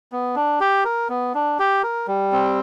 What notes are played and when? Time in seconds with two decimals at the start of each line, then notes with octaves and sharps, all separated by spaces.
0.12 B3
0.36 D4
0.60 G4
0.85 A#4
1.09 B3
1.34 D4
1.59 G4
1.83 A#4
2.08 G3
2.32 C4